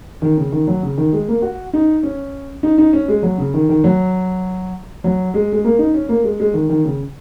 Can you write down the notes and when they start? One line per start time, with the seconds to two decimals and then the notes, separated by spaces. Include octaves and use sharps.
0.22 D#3
0.37 C#3
0.52 D#3
0.67 F#3
0.83 C#3
0.98 D#3
1.13 G#3
1.28 A#3
1.42 F#4
1.73 D#4
2.03 C#4
2.63 D#4
2.78 D#4
2.93 C#4
3.08 G#3
3.23 F#3
3.38 C#3
3.54 D#3
3.69 D#3
3.84 F#3
5.04 F#3
5.34 G#3
5.52 G#3
5.64 A#3
5.79 D#4
5.94 C#4
6.09 A#3
6.24 G#3
6.40 G#3
6.54 D#3
6.69 D#3
6.85 C#3